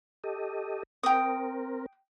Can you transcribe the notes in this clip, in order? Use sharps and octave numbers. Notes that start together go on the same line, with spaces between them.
G4 A4 D#5
C4 A#4 G5 D#6